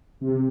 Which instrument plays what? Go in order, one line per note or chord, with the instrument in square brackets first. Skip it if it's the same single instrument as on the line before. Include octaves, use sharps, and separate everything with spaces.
[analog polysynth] C3